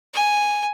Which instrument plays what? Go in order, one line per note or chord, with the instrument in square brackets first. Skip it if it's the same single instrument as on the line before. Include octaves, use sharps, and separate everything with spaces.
[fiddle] G#5